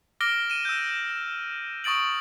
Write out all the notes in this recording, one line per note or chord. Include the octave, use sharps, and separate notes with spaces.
D6 F6 A#6 D7 G7
D#7 E7
E6 G6
C#6 D#6 A6 D7 F#7